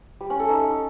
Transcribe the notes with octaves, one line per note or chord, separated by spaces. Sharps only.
G3
C#4
A4
D#4